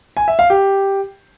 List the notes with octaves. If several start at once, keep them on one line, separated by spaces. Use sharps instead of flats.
G#5
E5
F5
G4